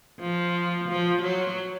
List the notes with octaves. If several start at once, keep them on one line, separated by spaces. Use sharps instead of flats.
F3
F3
F#3